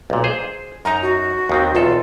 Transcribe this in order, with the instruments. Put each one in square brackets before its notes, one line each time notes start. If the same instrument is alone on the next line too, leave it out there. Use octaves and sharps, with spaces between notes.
[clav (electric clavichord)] B1 A#2
G#4 C5
[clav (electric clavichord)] F#2 D#4 [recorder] A#5
[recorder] F#4
[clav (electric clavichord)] D#2 D#3 C4
[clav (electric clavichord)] B1 E2 A4 [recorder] F4